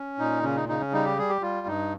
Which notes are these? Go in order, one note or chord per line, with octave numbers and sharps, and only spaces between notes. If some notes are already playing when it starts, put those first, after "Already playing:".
Already playing: C#4
A#2 D#4
C#3 C#4
D#4
C#3 D#4
C#4
G3 D#4
G4
G3 G#4
G4
G3 F4
G2 D#4